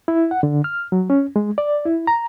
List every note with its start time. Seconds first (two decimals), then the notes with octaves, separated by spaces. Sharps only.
0.08 E4
0.31 F#5
0.43 D3
0.64 F6
0.92 F#3
1.10 C#4
1.36 G#3
1.58 D5
1.85 E4
2.07 A#5